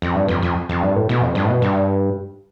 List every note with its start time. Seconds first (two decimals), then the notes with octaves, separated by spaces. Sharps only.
0.02 F2
0.15 G2
0.28 F2
0.42 F2
0.69 F2
0.82 G2
0.95 A2
1.09 B2
1.22 F2
1.35 G2
1.45 A2
1.49 B2
1.62 G2